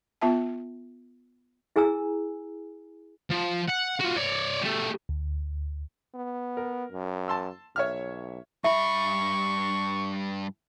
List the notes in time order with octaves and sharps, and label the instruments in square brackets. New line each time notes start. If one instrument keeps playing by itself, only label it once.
[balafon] B3 F4 E5 A5
[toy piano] E4 G#4 G#5 A#5 E6
[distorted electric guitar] F3
F#5
F4 F#4
C#5 D5
G3 A3
[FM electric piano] D2
[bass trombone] B3
[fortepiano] A#4
[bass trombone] F#2
[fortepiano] A5 C6 E6
[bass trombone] B1 [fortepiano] C#5 E5 F6
[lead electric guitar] G2 B5 [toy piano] E5 [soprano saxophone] C#6